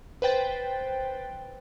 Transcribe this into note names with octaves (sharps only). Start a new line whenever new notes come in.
B4 C5 G5 A6